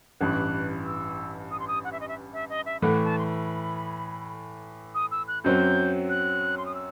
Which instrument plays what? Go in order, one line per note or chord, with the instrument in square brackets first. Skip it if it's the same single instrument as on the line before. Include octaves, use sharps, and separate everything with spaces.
[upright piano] A1 G2 E3 [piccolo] F#6
[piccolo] E6
D#6
C6
D#6
F#5
E5
D#5
E5
E5
D#5
E5
[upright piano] A2 E3 A3 [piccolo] F#5
[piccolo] A5
C6
B5
D#6
E6
F#6
[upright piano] F#2 F#3 C4 [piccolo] G6
[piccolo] F#6
C6
D#6
E6